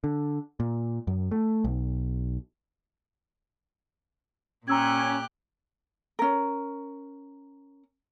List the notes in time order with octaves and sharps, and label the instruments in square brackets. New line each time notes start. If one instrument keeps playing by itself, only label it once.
[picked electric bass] D3
A#2
F#2
A3
B1
[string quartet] A#2 G4 F#6 [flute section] C#4 [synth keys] A#5 E6 G#6
[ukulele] C#4 A#4